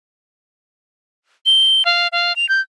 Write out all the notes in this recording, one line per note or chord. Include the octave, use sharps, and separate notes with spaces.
G7
F5
F5
F7
G6